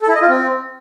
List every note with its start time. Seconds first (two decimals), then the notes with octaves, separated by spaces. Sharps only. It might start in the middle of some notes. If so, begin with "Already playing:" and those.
0.02 A4
0.08 E4
0.15 D#5
0.22 F4
0.29 C4